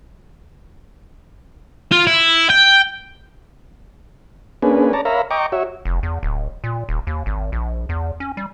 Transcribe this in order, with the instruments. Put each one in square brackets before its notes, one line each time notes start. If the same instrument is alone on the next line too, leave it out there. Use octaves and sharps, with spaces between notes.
[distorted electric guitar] F4
E4
G5
[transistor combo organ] A#3 C#4 D4 G#4 B4
C#5 D5 A5 A#5
A#4 C#5 E5 F5 A#5 B5
D#5 G5 A#5 C#6 D6
F#4 C#5 E5
[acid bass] F1
E2
D1
A#2
D#1
D#2
G#1
A#1
E2
C#4
G3